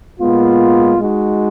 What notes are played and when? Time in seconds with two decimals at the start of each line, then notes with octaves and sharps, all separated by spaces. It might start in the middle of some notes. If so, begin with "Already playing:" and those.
0.19 A#2 G#3 B3 F4
0.99 G#3 D#4 F#4